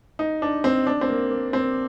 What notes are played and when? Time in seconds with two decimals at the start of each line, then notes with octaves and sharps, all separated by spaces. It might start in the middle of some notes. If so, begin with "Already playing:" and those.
0.19 D#4
0.42 D4
0.64 C4
0.87 D4
1.01 C4
1.09 A#3
1.31 A#3
1.53 C4